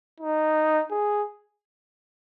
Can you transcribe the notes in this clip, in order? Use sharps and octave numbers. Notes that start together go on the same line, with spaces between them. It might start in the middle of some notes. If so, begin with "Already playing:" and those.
D#4
G#4